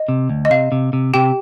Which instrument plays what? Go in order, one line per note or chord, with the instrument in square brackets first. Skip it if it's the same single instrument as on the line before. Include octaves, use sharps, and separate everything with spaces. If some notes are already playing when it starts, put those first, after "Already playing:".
Already playing: [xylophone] D#5
[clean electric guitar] C3
D2
[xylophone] D#5
[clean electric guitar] C3 [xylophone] F5
[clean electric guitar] C3
C3
[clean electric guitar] C3 [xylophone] G4 G5